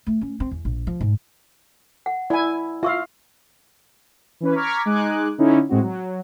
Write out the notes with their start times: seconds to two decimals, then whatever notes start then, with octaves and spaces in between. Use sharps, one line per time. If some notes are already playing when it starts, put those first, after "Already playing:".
0.07 A3
0.21 C#4
0.40 C4
0.51 E2
0.65 A#1
0.87 F3
1.01 G#2
2.06 F#5
2.30 E4 D5 G#5
2.83 F4 E5 F5 C#6 E6
4.40 E3 C#4 B4
4.55 A#5 C#6 D6 F6 G#6 B6
4.86 G#3 D#4 G#5 D6 F#6
5.38 D3 C#4 D#4 E4
5.69 A2 G#3 C4 F#4
5.82 F#3